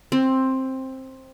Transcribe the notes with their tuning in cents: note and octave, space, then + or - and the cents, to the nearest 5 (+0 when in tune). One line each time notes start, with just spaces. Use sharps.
C4 +10